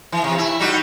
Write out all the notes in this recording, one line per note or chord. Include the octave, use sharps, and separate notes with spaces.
E3
C3
E4
G3 D#4 F#4